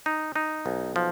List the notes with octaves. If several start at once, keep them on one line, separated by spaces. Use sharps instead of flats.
D#4
D#4
B1
F3